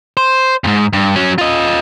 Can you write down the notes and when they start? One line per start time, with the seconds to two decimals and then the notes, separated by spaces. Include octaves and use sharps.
0.17 C5
0.64 F2 G#2
0.93 G2
1.16 F#3 C#4
1.38 F4 D#5